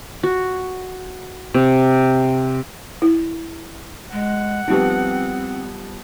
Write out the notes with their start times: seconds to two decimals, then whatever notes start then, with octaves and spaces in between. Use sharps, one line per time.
0.23 F#4
1.54 C3
3.02 E4
4.12 G#3 F#5
4.68 F3 G3 B3 C4 D#4 G4